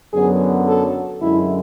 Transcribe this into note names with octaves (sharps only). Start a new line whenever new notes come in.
F#2 D3 F#3 B3 G#4
A4
F#2 D3 G#3 E4